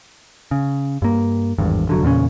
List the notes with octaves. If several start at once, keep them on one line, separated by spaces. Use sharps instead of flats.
C#3
G2 A#3
G#1 E2 G2
F1 D3 F#3
E2 A#2 C#3 C#4